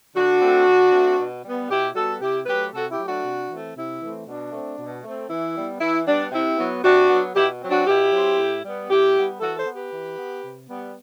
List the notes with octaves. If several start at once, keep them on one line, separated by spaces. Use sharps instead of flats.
D3 D4 F#4
A3 C4
D3
A3 C4
B2
G3 B3
B2 E4 G4
G3 B3 F#4 A4
C3 E4 G4
F#3 A3 G4 B4
C3 F#4 A4
E4 G4
F#3 A3
D4 F#4
C3
E3 A3 C4
C3 E4
E3 A3 C4
B2 D4
A3 C4
B2
A3 C4
E3 E4
G3 B3
E3 E4
G3 B3 D4
C3 E4
F#3 B3
C3 D4 F#4
F#3 B3
B2 E4 G4
F#3 C4
D4 F#4
B2 E4 G4
F#3 C4
A2
G3 B3
A2 E4 G4
G3 B3
E3 F#4 A4
A4 C5
B3
G4 B4
E3
B3
C3
G3 B3